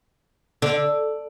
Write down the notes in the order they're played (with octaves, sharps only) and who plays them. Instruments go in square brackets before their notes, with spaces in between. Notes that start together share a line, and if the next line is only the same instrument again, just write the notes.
[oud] D3